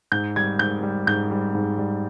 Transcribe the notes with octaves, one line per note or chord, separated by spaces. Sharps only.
G#2 G6
G3 G#6
G#2 G6
G3
G#2 G6
G3
G#2
G3